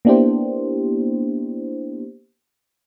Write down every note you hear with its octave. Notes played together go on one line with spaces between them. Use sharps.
A#3 B3 D4 E4 G4 C5